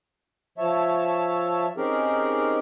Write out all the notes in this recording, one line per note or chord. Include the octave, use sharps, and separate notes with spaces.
F3 C#5 E5 A5
C4 C#4 D#4 G4 G#4 A#4